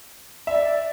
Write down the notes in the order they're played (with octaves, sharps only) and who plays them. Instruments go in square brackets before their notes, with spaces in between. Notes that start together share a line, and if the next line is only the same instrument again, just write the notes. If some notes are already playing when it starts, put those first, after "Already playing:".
[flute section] D5 [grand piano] E5